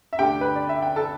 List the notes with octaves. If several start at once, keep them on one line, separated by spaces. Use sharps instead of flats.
E5
D2 D3 G4 G5
B4
D5
E5
G5
A4 A5